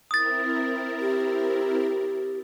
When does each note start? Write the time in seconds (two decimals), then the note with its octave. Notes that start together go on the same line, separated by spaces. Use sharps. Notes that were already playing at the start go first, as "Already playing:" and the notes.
0.11 C4 E4 A#4 D#6 A6
1.01 G4